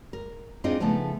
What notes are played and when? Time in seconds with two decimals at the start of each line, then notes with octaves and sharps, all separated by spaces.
0.13 A#4
0.64 C4 D4 D#4 F4 G#4 D#5
0.80 C#3 F3 A3 B3 D#4